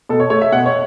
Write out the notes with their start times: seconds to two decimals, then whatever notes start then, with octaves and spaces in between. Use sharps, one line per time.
0.09 B2 A4
0.20 C#5
0.30 A3 C#5
0.42 E5
0.52 B2 F#5
0.66 C#5